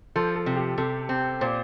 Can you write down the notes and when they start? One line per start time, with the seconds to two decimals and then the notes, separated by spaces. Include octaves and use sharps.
0.16 F3 A4
0.35 A4
0.46 C3
0.56 G4
0.78 C3 A4
1.09 C4
1.41 A#2 C5